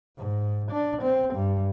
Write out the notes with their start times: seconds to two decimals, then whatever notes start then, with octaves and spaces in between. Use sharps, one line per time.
0.17 G#2
0.71 D4
1.02 C4
1.34 G2